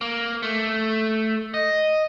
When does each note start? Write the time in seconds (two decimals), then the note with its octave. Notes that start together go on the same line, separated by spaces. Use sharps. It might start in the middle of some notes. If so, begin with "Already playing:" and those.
0.01 A#3
0.42 A3
1.54 D#5